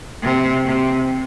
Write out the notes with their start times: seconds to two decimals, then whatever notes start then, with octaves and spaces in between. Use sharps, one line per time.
0.22 C3
0.65 C3